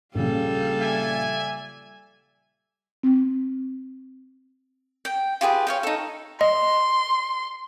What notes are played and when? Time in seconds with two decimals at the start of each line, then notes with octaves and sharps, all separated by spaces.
0.15 A#1 C#3 G3 A4 F5
0.81 D5 E5 G#5
3.03 C4
5.05 G5
5.41 F4 G4 G#4 B4
5.67 C#5 F5 G5
5.83 D#4 A4
6.41 D#5 C6